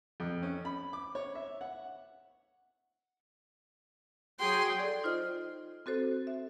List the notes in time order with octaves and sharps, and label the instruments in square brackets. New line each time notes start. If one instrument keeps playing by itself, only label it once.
[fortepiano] F2
C#4
B5
D6
C#5
E5
F#5
[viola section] F#3 G#4 G5 [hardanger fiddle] C6
[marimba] A4 D5
D#4 F4 C5 D#5 F6
C4 F#4 A4 C5
E5